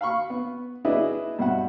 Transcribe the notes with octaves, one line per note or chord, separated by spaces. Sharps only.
F5 B5 C#6
B3
D4 E4 G#4 B4 D#5 E5
G2 B2 E5 F#5